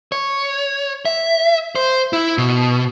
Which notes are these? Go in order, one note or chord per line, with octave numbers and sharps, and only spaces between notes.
C#5
E5
C5
E4
B2